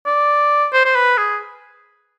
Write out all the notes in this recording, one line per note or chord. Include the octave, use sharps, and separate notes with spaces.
D5
C5
C5
B4
G#4